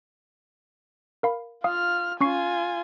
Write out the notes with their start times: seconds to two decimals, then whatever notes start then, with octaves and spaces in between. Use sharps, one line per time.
1.23 A#4 F5 B5
1.64 F4 F5 D#6 F6
2.20 C#4 F4 G#5 C#6 C7